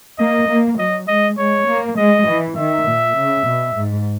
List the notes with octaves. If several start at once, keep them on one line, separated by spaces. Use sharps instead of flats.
A#3 D#5
A#3
F#3 D#5
G#3 D#5
G#3 C#5
A#3
G#3 D#5
E3
D#3 E5
A#2
C#3
B2
G#2